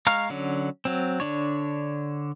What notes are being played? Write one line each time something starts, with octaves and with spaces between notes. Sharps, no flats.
G#3 F5 A#5 C#6 F6
D3 F#3 C#4
F#3 C4
D3 D4 C#5